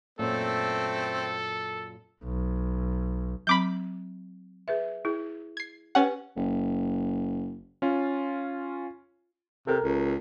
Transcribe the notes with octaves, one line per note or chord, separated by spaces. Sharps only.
F#2 A#2 A3 C4 A4
B1
F#3 C4 B5 D6 G6
G#4 B4 E5
E4 G#4
G#6 C7
C#4 G4 B4 F#5
F#1
C#4 F4
C3 A4 A#4
C#2